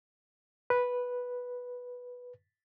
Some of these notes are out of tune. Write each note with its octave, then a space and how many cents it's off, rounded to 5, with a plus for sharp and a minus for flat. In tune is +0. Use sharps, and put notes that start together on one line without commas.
B4 -5